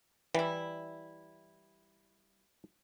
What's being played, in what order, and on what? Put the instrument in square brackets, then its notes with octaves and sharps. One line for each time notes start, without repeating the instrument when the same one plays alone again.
[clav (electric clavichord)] E3 [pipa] G3 E4